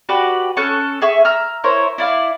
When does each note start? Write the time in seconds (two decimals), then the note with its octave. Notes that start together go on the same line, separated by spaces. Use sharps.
0.09 F#4 G4 B4 D5
0.57 C#4 A4 C#6 F#6
1.02 G#4 E5 C#6
1.25 A#5 E6 F6
1.64 E4 A#4 C5 C#5
1.98 E4 D5 F5